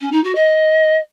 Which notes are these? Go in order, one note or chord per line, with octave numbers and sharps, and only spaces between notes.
C#4
D#4
F#4
D#5